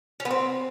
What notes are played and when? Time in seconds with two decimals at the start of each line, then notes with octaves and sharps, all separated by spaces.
0.20 C#4
0.25 B3
0.31 C4